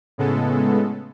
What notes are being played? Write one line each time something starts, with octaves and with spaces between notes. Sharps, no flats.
A2 C#3 G#3 B3 A4